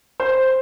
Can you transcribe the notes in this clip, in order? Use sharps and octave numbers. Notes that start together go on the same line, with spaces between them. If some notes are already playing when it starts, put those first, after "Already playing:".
C5